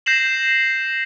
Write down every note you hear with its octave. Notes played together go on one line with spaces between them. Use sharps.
G6 A#6 C7 E7 F#7